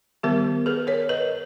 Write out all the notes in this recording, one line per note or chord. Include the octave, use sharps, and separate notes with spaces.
D#3 G3 B3 G4 A#4
G#4 B4
A#4 C#5
B4 D#5